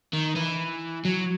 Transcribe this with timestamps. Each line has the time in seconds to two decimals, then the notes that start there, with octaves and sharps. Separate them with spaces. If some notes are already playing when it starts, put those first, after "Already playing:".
0.14 D#3
0.36 E3
1.05 F#3